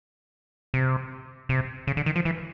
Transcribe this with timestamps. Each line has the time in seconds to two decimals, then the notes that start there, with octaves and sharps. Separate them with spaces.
0.74 C3
1.49 C3
1.87 C#3
1.97 D3
2.06 D#3
2.16 F3
2.25 E3